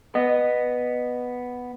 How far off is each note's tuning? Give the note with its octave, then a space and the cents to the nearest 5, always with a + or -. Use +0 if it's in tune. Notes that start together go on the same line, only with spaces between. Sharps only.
B3 +0 D#5 -20